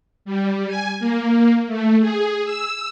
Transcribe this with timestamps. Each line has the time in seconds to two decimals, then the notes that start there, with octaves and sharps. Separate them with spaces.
0.25 G3
0.67 G#5
0.99 A#3
1.67 A3
2.01 G#4
2.45 E6